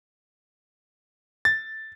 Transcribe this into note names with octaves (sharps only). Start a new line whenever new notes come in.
A6